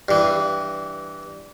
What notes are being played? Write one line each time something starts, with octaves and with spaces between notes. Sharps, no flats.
G2 E3